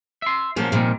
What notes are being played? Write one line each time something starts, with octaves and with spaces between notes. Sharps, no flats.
E5 C6
A#2 F3 F#3 A#3 C#4
C2 A#2 D#3 F3 G3